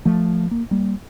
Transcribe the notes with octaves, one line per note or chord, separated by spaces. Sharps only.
F3 A3
A#3
G3 A#3